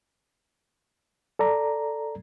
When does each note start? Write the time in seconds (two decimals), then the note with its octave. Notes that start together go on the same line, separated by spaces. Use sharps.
1.39 A4 D5 A#5